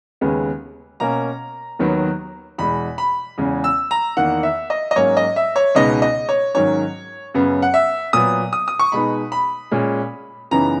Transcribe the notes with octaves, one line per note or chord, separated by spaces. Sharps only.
D#2 C#3 G#3 B3
B2 A#3 C#4 A#5
D#2 D#3 F#3 B3 D#4
E2 B2 G#3 B5
B5
E2 C#3 G#3
E6
A#5
E2 D#3 A#3 F#5
E5
D#5
D#5
G#2 F#3 A#3 C#4 C#5
D#5
E5
C#5
C#2 B2 G#3 B3 D#4 D#5
D#5
C#5
G#2 D#3 F#3 C#4 C#5
F#2 C#3 F#3 B3
F#5
E5
A#2 F#3 B3 D#6
D#6
D#6
C#6
B2 G#3 B3 D#4 B5
B5
A#2 G#3 C#4
F#2 C#3 E3 B3 D#4 A#5